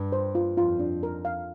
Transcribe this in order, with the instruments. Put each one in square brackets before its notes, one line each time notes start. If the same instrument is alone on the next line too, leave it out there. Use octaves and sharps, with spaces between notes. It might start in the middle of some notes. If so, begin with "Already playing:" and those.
Already playing: [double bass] G2
[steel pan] C5
F4
[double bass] F2 [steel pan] F4
[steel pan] D4
A#4
F5